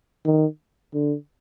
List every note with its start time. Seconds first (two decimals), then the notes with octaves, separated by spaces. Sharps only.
0.25 D#3
0.94 D3